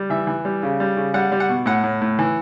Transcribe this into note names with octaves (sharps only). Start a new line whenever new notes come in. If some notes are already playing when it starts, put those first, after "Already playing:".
Already playing: G3
E3 E5
E3
G3
C#3
G3
C#3
G3 F#5
G3
F#5
B2
A2 F#5
A2
A2
E3